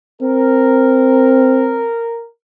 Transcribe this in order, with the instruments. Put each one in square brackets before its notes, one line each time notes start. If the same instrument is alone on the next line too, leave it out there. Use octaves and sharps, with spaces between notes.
[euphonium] C4 [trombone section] A#4